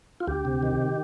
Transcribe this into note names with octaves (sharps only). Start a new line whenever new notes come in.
F4
D2 G4
C3
D#3